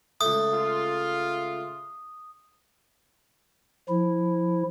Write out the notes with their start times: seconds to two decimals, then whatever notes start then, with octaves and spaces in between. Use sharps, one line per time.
0.21 C#2 A3 D#6
0.53 F4
3.89 F3 E4